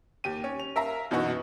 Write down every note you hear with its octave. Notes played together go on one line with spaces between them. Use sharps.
D#2 G4 D#7
C#4
F7
A#4 E5 F5 A#5
F#2 B2 E3 D#4 F#4